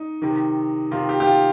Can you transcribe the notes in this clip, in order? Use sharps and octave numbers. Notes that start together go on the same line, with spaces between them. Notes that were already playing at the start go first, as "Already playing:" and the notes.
Already playing: D#4
C3 D#3
C3 D#3 F4
G4
G4
F4